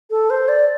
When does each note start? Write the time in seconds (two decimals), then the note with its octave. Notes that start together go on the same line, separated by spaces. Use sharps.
0.10 A4
0.30 C5
0.48 D5